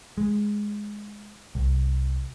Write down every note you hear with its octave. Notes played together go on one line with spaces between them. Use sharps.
G#3
C2